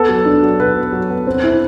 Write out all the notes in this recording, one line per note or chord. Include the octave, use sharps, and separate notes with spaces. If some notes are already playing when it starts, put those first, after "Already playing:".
Already playing: B3 A4
F#3
D4
F#3
F#3 B4
B3
F#3
B3
C4
E4